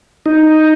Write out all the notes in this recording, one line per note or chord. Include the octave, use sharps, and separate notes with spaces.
D#4